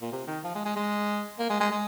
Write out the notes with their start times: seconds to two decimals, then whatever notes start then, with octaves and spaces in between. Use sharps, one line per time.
0.02 A#2
0.12 C3
0.27 D#3
0.44 F3
0.55 G#3
0.65 G#3
0.76 G#3
1.39 A#3
1.50 G#3
1.60 G#3
1.71 G#3